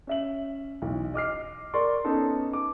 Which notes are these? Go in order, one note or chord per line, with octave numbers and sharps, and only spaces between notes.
C#4 E5 F#7
B1 E3
D#5 D6 F6 C7
A#4 D5 C6 C#6
B3 C#4 D#4 A4
D6